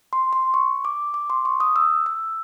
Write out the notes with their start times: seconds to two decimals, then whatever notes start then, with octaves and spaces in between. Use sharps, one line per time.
0.13 C6
0.33 C6
0.54 C#6
0.85 D6
1.14 D6
1.30 C6
1.45 C#6
1.60 D#6
1.76 E6
2.06 E6